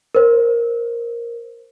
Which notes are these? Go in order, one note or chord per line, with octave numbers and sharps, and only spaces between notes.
A#4 C5